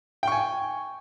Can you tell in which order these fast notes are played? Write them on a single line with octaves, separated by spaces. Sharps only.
G5 C#6 G#5